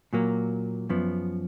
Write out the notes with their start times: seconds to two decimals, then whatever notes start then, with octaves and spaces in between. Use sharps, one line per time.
0.13 A#2 F#3 A#3
0.89 F#2 F3 B3